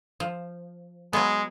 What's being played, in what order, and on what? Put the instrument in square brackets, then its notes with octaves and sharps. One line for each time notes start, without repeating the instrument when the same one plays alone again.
[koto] F3
[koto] F#3 B3 [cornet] G#3